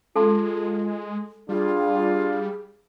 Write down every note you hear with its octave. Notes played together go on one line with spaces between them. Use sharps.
G#3 F4 A4 A5 C6
G3 D4 F4 G#4